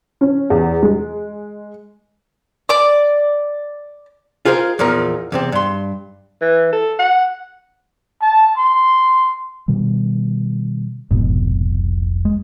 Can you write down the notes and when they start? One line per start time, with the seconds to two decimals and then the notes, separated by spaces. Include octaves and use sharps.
0.21 C#4
0.50 E2
0.83 G#3
2.69 D5 D6
4.45 F4 G#4 A#4 C5 D#5
4.79 E2 A#2 F3 D#4 A#4
5.32 E2 C3 C4
5.52 G2 C6
6.41 E3
6.73 A4
6.99 F#5
8.21 A5
8.57 C6
9.68 B2 D#3 G3
11.11 F1 C2 F2 G#2 B2
12.25 G#3